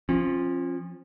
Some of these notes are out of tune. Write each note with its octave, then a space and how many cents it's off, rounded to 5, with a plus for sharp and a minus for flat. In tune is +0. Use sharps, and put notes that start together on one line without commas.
F3 +0 C#4 -40